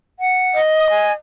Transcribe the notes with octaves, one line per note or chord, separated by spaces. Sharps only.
F#5
D#5
D#6
G#5